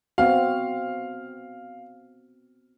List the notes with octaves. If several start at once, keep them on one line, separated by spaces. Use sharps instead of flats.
B3 C4 F#4 F5